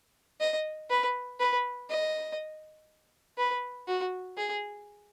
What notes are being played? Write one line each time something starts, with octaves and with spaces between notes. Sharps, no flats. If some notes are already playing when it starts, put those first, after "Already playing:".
D#5
B4
B4
D#5
B4
F#4
G#4